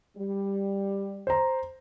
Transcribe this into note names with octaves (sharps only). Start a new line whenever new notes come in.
G3
C5 A#5